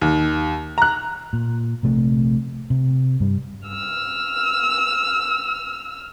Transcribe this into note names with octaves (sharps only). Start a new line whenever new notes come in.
D#2
A#5 F#6
A#2
A#1 C3 A3
C3
G2 G3
E6 F6